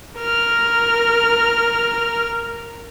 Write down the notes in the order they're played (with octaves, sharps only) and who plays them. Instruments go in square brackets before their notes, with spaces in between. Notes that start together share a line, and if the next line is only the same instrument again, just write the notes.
[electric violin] A#4 F6